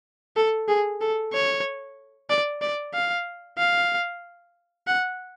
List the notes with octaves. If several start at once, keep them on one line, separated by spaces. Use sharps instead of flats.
A4
G#4
A4
C#5
D5
D5
F5
F5
F#5